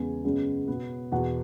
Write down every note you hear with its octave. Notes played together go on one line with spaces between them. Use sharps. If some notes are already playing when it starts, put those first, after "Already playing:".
Already playing: E2 C#3 G#3 B3 G#5
F#2 C#3 G#3 B3
B2 B3
E2 B2 B3 F#5